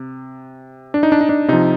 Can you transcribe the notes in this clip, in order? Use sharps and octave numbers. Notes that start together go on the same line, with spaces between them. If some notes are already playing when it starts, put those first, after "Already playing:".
Already playing: C3
D4
D#4
D4
D#4
D4
C3 F3 D#4